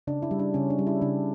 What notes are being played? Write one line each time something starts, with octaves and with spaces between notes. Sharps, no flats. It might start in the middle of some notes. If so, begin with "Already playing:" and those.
C#3 D4
E4
G3
D4
C#3 C#4
D4
G3
E4
C#3 D4